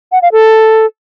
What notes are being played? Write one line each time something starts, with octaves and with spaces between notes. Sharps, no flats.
F#5
F5
A4